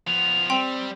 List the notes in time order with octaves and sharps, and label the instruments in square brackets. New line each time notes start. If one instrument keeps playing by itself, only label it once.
[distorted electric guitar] F3 B3 [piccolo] F7
[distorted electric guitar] G3 [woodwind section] C4 [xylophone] G5 C6